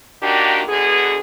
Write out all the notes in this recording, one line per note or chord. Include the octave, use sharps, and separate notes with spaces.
A#2 D#3 A#3 D4 F#4 G4
B2 D3 B3 G#4